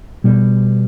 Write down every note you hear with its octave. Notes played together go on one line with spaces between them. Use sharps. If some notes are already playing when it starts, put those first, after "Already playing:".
B2 G3 B3